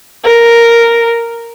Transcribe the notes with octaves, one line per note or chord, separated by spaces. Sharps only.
A#4